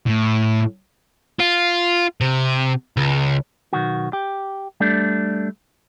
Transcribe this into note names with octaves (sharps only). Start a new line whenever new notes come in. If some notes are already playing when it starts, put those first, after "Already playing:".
A2
F4
C3
C#2
B1 D#3 F#4
G4
G3 A3 D4